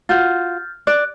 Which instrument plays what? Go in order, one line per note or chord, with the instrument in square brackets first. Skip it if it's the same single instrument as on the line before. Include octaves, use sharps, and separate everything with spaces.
[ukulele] F4 F#4 [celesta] F6 G6 A6
[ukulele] D5 [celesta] F#6